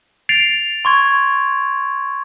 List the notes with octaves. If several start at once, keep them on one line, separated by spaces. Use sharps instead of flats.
A6 C7 D7 F7
C6 C#6 G#6